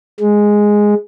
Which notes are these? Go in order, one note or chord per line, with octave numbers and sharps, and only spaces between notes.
G#3